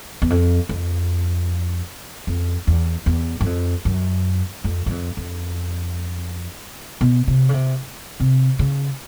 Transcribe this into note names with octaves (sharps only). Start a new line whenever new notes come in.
E2
F2
F2
F2
E2
E2
F#2
F2
F#2
F2
F#2
F2
F2
B2
C3
C#3
C3
C3
C#3